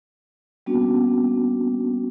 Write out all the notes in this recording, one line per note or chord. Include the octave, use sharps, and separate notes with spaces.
G3 A#3 B3 C#4 D4 F#4